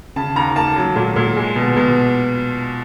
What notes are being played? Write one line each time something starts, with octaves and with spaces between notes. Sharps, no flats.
C#3 A5
D#2 A#5
A#3 A5
F#3
A#2
A#2
G#3
B2
B2